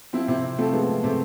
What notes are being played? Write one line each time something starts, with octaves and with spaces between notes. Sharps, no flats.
F3 C4 E4
C3 C4 E4
C3
F3 A3 C4
F3 G#3 B3
C3
C3 A3 C4